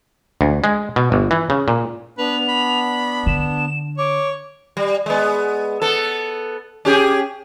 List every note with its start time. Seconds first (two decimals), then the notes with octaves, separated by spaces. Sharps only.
0.41 D2
0.64 G#3
0.96 B2
1.12 G1
1.31 E3
1.50 C#3
1.68 A#2
2.18 B3 D4 B4 F7
2.49 B5
3.26 D3 E7
3.98 C#5 D6
4.77 G3
5.06 G#3 B3
5.82 B3 A4
6.85 C#4 G4 G#4